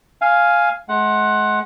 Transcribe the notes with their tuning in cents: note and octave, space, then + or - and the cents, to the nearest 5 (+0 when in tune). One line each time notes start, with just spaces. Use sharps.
F5 +0 G#5 +0
G#3 +35 F#5 +0